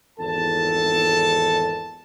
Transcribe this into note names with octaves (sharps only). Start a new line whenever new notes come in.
G#1 E2 A4 A5